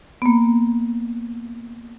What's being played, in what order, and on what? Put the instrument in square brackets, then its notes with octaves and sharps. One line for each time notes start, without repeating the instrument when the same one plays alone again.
[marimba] A#3 B3